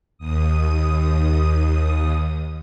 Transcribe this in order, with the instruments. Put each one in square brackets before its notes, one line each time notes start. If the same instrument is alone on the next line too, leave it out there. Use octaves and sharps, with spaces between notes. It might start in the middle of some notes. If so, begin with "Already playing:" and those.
[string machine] D#2 D#6